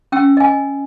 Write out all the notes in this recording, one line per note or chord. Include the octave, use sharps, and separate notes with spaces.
C#4 G5 E6
D#5 G#5